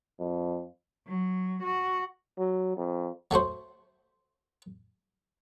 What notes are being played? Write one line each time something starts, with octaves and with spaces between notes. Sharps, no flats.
F2
F#3
F#4
F#3
F2
F#3 A3 F#4 C5